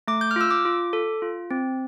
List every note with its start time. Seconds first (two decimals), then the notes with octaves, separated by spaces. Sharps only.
0.07 A3 D6
0.21 G6
0.31 F6
0.36 F4 E6
0.51 D6
0.65 F4
0.93 A4
1.22 F4
1.51 C4